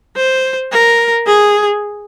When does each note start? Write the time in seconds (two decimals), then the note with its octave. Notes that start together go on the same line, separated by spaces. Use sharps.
0.17 C5
0.72 A#4
1.26 G#4